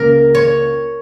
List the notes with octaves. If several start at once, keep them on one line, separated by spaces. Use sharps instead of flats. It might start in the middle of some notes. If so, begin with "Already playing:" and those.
Already playing: C#2 C#3 A#3 A#4
C#5